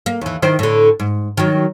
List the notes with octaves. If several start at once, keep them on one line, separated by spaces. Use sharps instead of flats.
A#3
D#2 E3
D#3 E4 C5
A2 D3
G#2
D#3 F#3